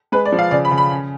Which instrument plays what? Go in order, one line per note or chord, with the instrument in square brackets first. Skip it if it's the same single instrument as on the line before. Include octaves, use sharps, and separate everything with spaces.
[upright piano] G#3 B4
D5
F3
F5
C#3 D5
B5
C#3
B5
C#4